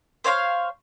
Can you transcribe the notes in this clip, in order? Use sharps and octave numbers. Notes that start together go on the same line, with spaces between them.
C5 C#5 F5 C6